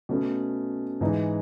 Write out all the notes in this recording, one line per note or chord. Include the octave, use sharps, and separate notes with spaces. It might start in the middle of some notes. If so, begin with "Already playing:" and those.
B2 A3 C#4
G#2 E3 G#3 D#4